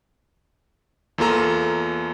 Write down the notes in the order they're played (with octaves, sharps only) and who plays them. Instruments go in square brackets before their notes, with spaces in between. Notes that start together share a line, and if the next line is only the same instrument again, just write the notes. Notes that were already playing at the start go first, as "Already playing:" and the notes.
[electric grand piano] E2 A#3 F4 A4 A#5